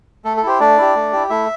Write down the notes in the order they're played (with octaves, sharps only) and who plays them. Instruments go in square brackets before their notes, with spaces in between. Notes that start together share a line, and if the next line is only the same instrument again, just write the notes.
[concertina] A3 A4
A4
E4 G4 C5
A3 D4 D5
E4 G4
A3
E4 G4
A3 E4 E5